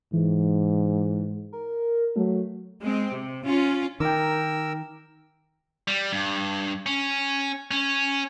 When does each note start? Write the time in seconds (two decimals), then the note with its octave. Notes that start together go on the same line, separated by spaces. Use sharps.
0.13 G#2 E3
1.53 A#4
2.16 F#3 A3
2.80 G#3 C4
3.13 C3
3.46 C#4 F4
4.00 D#3 A#4 G5 A#5 D6 E6
5.88 G3
6.13 G2
6.86 C#4
7.71 C#4